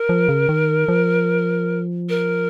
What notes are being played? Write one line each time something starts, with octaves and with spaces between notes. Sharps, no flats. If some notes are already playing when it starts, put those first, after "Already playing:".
Already playing: A#4
F3
C#3
D#3
F3
A#4